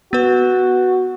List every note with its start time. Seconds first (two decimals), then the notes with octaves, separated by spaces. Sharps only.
0.13 B3 F#4 B4